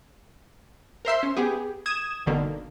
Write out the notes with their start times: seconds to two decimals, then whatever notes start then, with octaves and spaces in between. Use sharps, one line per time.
1.05 A#4 C5 E5 C6
1.23 C#4
1.37 B3 G4 G#4
1.86 D#6 G#6 E7
2.26 G1 B2 D3 D#3 A#3